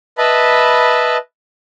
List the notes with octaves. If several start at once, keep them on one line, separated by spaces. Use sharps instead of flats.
B4 D#5 E5 A5 B5